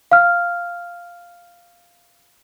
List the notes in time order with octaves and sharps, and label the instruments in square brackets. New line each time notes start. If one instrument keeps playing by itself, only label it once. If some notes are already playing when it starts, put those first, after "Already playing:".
[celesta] F5 F6